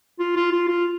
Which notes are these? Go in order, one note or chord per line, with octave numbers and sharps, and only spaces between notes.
F4
F4
F4
F4